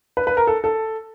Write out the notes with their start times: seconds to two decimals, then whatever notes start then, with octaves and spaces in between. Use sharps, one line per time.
0.17 B4
0.27 B4
0.37 A#4
0.47 A4
0.64 A4